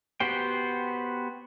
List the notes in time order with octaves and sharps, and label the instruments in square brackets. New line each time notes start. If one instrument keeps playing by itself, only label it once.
[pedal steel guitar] B3 F#4 G4 C5 G5